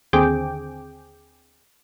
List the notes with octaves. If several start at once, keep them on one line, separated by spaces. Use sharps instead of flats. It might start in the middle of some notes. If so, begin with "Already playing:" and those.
D#2 D3 C4 G#4 G5 D6